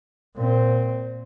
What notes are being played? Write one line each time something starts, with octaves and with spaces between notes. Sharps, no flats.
A#2 C4